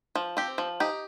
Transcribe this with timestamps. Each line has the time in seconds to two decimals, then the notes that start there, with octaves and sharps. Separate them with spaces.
0.15 F3
0.37 C4 G4
0.58 F3
0.80 D#4 G4